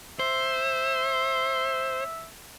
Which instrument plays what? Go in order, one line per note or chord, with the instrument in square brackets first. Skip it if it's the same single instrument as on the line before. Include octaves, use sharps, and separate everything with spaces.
[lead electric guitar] C5 [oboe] E5